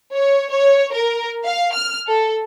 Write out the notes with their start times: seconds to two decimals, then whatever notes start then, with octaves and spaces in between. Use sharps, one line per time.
0.12 C#5
0.50 C#5
0.93 A#4
1.44 F5
1.73 F6
2.07 A4